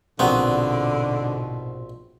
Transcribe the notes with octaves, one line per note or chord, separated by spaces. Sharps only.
A#1 G#2 B2 D3 F#3 B3 C4